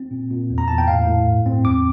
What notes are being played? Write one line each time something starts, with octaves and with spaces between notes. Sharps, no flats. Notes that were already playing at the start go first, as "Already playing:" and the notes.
Already playing: C4
A#2
A#2
E2
A#5
E2 A5
G5
A2 F5
A2
G2
C4
E2 D6